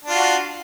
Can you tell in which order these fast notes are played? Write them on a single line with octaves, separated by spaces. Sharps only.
D4 F4 F#4